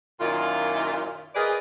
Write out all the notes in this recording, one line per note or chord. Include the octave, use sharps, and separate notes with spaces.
F#2 A#2 D#3 E4 F4
F4 G#4 A#4 B4 D5 D#5